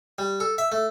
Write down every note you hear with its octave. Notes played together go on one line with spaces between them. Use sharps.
G3
A4
E5
A3